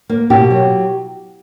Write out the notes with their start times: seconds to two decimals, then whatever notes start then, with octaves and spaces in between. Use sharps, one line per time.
0.10 A#3
0.30 B2 G4
0.51 F#3